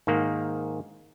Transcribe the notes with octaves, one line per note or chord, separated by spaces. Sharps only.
G#2 D#3 A#3